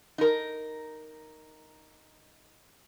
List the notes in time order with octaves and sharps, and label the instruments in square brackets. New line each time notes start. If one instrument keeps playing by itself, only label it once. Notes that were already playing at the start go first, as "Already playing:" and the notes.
[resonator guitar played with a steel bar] D#4 A#4